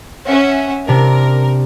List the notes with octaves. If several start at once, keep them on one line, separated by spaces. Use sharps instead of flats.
C#4 E5 F#5
C3 D4 A#4